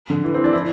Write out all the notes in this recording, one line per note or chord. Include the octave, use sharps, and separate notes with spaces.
D3
E3
C4
D4
E4